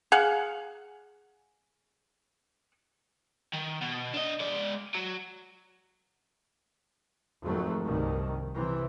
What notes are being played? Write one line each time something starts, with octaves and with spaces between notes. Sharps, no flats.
G#4 F5 F#5
D#3
B2
D4 D#5
G#3 D5
F#3
F2 G#2 D#3 F#3 A3
C2 G2 D#3
C3 E3